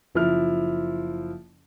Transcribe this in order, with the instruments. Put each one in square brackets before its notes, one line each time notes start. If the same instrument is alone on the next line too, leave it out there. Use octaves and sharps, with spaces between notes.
[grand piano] F#1 F3 E4 F6